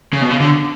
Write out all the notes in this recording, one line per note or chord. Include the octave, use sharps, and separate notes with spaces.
C#3
B2
C#3
D3